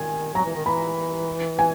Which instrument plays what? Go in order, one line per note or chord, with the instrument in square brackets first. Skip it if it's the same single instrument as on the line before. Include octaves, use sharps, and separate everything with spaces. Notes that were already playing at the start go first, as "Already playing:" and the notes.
Already playing: [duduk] D#3 [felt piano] G#5
[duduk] F#3 [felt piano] A#5
[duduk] E3
D#3
[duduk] E3 [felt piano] B5
[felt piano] G#5